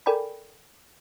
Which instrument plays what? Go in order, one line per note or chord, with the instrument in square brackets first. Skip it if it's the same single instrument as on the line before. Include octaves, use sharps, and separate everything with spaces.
[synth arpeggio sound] A4 A#4 D5 G5 G#5 B5